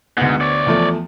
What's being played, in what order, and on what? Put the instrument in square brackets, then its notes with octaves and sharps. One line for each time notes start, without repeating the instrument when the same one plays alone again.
[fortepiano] D2 B3 [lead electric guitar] G#2
[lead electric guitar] C#5 D5
[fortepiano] E2 F3 A3